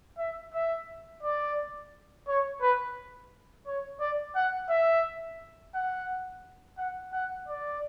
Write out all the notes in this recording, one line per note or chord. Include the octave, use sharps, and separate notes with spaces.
E5
E5
D5
C#5
B4
C#5
D5
F#5
E5
F#5
F#5
F#5
D5